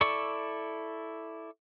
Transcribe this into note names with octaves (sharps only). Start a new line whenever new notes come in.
E4 A4 D5 C#6